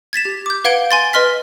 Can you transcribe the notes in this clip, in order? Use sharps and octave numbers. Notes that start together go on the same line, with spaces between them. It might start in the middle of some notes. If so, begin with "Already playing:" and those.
G#6 A6 B6 E7
G4
D6 G6
B4 F5 F#5 G#6 D7 G7
G#5 C6 A6
B4 D#5 C6 F6 B6